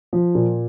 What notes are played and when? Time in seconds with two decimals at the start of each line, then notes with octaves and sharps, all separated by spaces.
0.13 F3
0.35 A#2